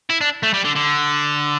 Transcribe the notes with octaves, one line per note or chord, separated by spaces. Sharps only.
E4
D4
A3
G3
D3
D3